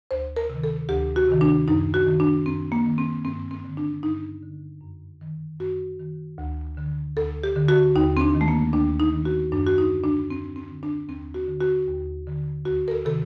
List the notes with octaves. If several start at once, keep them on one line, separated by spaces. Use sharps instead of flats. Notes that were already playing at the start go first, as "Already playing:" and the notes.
D2 C5
A#4
C3
D#3
A4
D2 G4
F#4
C3 D#3
D4
F#2 D#4
F#4
D#3
D4
F#2 C4
A#3
D#3
C4
G2 C4
C4
D3
D4
G2 D#4
D3
F#2
D#3
F#2 F#4
D#3
D2
D3
D2 A4
G4
D3
F#4
D#2 D#4
C4
D4
D#3
A3
A#3
D#2 D4
D#4
D#3
F#4
F#2 D4
F#4
D#4
D3
D4
F#2 C4
C4
D3
D4
D#2 C4
F#4
D3
F#4
D#2
D3
D2 F#4
A#4
A4
C3 D#3 A4